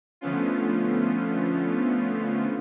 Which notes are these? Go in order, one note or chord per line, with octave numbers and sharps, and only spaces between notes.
D3 F3 A3 B3 C#4 F4